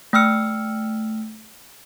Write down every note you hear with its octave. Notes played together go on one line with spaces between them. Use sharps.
A3 G5 E6 F6 C#7